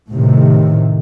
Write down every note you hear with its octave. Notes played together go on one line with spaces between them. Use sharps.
A2 C3 D#3